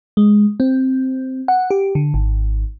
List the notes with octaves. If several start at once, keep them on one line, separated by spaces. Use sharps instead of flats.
G#3
C4
F#5
G4
D3
G#1